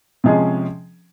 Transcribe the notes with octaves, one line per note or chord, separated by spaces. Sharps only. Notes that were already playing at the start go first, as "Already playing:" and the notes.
C3 F3 G#3 C#4 G#4